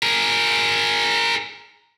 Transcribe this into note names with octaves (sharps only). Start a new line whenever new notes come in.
G#4 A#4